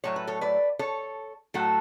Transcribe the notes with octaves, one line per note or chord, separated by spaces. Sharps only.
A2 F#3 A3 C#5
B4
A4 C#5
B4 D5
A4 C#5
A2 F#3 A3 F#4 A4